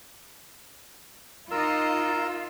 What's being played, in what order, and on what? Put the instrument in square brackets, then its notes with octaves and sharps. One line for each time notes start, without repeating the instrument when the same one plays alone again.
[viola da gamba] D#4 D#5 [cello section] F4 [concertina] A#4 E6